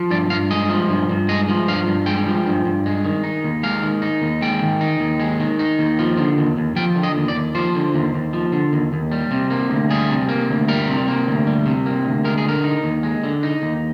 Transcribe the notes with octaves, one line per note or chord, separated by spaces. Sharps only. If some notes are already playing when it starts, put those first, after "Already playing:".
Already playing: F3
G2 D5
G2 F5
G#3 D#5
F3
G2
G2
G#3 D#5
F3
G2 F5
G2
G#3 G5
F3
G2
G2
G#3
D#3
D#4
D#2
G#3 F5
D#3
D#4
D#2
G#3 G5
D#3
D#4
D#2
G#3
D#3
D#4
D#2
F3
D3
D#2
D#2
F3 G5
D3
D#5
D#2
D5
D#2
F3 C5
D3
D#2
D#2
F3
D3
D#2
D#2
G3
C3
A#3
D2
G3 G#4
C3
A#3
D2
G3 A#4
C3
A#3
D2
G3
C3
A#3
D2
G#3 A#4
G#4
D3 A#4
D#4
D#2
G#3
D3
D#4
D#2